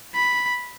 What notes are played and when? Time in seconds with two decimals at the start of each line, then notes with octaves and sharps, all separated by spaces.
0.15 B5